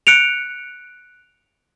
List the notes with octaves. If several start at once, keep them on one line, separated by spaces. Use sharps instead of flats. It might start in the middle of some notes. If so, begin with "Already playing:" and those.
F#6 C#7 D7 F7